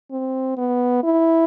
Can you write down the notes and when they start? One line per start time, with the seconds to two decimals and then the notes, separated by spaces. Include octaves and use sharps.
0.11 C4
0.57 B3
1.04 E4